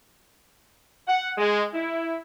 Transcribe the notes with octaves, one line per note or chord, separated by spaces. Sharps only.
F#5
G#3
E4